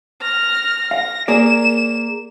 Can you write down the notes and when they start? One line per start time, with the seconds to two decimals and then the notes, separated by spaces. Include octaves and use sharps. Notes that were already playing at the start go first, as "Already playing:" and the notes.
0.21 F6 A#6
0.91 F5 A#6
1.28 A#3 G#4 D5 E7